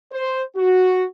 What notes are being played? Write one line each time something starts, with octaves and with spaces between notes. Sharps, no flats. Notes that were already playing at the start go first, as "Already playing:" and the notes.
C5
F#4